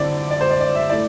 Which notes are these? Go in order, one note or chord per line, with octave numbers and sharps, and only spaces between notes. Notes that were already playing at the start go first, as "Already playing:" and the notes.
Already playing: D3 C4 E4 D5 D6
D5
C5
D5
D5
E5
A3 E4 D5